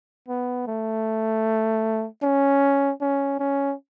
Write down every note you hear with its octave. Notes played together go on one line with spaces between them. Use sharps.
B3
A3
C#4
C#4
C#4